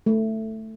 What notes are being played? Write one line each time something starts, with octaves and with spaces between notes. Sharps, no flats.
A3